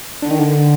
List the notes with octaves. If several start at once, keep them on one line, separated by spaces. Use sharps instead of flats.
D3
D#3
D3